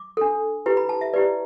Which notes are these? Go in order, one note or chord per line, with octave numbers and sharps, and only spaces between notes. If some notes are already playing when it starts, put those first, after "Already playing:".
Already playing: D6
D4 A4
E4 G4 B4
B5
A5
E5
E4 G4 B4 D5